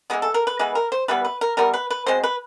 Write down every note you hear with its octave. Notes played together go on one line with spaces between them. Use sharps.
E3 G#3 B3 G#4
A4
A#4
B4
E3 G#3 B3 B4
A#4
C5
E3 G3 B3 B4
B4
A#4
E3 G3 B3 A#4
B4
B4
B2 G#3 C4 C5
B4